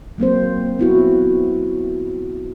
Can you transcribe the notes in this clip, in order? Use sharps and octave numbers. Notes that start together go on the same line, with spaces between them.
F#3 A#3 C4 C5
B3 E4 F#4